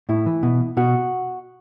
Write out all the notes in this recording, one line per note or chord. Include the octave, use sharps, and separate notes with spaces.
A2 E4
E3
B2
B2 F#4